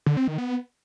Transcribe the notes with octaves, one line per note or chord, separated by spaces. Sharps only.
D3
C4
D#3
B3